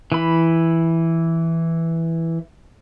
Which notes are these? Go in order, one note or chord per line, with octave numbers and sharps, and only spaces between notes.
E3 B5